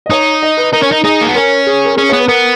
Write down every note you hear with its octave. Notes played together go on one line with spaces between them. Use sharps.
D#5
D#4 C#5
D#5
B4
D#4 A#4
C#4
D#4
D#4 G#4
A#3
B3
C#4 A#4
G#4
A#4
C#4 G#4
B3 C#5
B4
B3 A#4